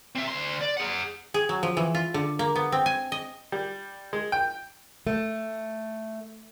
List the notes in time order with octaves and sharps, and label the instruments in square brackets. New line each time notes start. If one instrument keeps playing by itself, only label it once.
[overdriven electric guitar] C4 E5
D2 C6
D5
G#4 F#5
[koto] G#4
F#3
F3
E3
F4
D3
A#3
B3
C4
G#5
D#5
[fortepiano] G3
G#3
G5
[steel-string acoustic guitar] A3